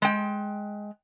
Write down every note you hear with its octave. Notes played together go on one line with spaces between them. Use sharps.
G#3 G5